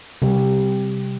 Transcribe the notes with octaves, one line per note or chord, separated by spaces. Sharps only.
C3 G3 G4